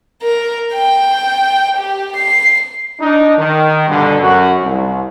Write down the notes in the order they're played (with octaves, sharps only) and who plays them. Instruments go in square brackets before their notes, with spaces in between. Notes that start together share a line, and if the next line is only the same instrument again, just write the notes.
[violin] A#4
G5
G4
C7
[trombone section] D4 D#4
D#3
G2 B2 D3
F#2 F#4
C2